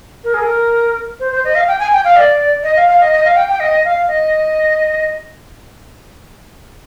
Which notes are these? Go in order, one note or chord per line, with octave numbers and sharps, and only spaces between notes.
A#4
G#4
A#4
C5
C5
D#5
F5
G5
G#5
G5
F5
D5
D#5
F5
F5
D#5
D#5
F5
G5
G5
D#5
F5
D#5